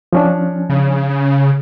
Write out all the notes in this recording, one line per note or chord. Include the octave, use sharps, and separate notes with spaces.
F3 C#4 D4
C#3